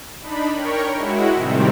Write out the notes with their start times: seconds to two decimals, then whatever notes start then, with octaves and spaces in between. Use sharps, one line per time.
0.20 D4 D#4 B5
0.53 A#4 C#5 G5 C#6
0.95 G#3 E4 F#4
1.35 A2 C3 D#3 G3 C4